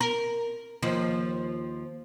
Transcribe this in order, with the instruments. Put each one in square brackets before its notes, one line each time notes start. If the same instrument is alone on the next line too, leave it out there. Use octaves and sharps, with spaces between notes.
[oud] A#4
D#2 F3